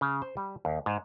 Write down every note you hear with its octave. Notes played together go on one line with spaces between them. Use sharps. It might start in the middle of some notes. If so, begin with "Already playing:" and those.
C#3
C5
G3
D#2
G#2